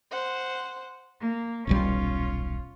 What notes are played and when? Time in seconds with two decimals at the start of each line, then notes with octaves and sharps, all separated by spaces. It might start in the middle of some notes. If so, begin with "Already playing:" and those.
0.11 C5 F#5
1.21 A#3
1.67 D#1 B1 G3 C#4 F4